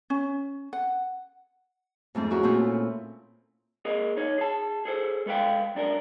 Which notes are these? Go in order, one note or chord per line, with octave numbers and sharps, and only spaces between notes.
C#4
F#5
F2 G#2 A3 C4
C4 E4 F#4 G#4 A#4 C#5
A#2 A3 C4 C#4 E4 F4
A#3 G#4 A#4 D#5
D#4 C#5
G#4 A5
G#4 A4 C5
G#3 A4 B4 F5 G5
F#2 D4 A4 A#4